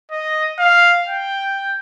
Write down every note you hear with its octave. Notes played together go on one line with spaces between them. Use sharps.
D#5
F5
G5